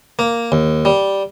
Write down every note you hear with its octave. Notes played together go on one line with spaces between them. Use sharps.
A#3
D#2
G3